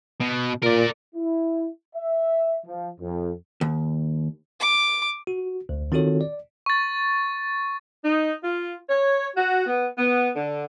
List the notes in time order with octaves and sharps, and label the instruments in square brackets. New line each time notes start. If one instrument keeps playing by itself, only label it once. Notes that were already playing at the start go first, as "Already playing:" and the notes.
[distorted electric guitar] B2
[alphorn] A#2 [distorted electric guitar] A#4 D5
[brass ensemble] E4
E5
F3
F2
[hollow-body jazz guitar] D#2
[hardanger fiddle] D6
[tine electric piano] F#4
D2
D#3 C4 F4 F#4 A4 C#5
D5
[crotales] C#6 A6
[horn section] D#4
F4
C#5
F#4
B3
B3
D3